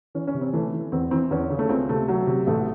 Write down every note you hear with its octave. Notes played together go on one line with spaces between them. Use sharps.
E3 C#4
C#4
C3
C4
E3 A3
E3
E2 C4
E3 C4
E2 C#4
C#3
A3
C#2 C4
C3 A3
F#3
C3
A1 A3